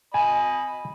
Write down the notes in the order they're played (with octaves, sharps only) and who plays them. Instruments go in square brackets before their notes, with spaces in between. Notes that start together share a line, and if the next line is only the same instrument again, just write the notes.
[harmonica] D#5 B5 [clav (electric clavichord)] G#5